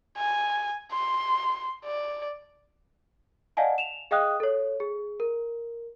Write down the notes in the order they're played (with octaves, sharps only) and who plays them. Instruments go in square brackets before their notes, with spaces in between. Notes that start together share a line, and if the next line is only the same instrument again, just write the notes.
[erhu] G#5
C6
D5
[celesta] D5 D#5 F5 F#5 G#5 A5
E7 F7
G#4 D#5 F5 G5 D#6 F#6
A4 C#5
G#4
A#4